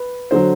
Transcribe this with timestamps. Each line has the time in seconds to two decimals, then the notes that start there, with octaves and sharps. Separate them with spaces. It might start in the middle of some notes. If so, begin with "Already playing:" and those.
Already playing: B4
0.31 D3 F#3 C5